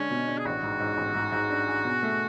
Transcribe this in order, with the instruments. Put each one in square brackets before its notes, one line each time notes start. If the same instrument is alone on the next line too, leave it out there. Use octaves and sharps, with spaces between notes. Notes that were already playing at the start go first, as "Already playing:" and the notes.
Already playing: [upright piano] D3 G#3 D4 [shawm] C#4
[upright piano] B2
D4
[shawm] G#4
[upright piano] A1 [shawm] F#4
[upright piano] G#2
G#2
A1
G#2
G#2
D4
G#4
B2
A3